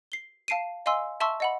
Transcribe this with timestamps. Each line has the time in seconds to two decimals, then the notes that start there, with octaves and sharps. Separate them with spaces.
0.12 C7 G7
0.48 F5 A5 C7 D7 D#7
0.86 D#5 F5 G#5 C6 E6
1.20 E5 A5 C6 C#6 E6
1.40 D#5 F#5 B5